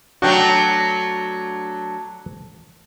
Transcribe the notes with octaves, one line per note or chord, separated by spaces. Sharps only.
F#3 A3 D4 F#4 G5